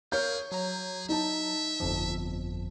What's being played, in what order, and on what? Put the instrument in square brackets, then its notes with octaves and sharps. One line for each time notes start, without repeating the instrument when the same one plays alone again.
[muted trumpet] G#4 [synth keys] A#4 F5 [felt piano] C#5 G6
[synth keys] F#3 A#5 [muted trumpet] G#4
[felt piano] D#4 A5 [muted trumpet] E5
[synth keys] G1 F2 F3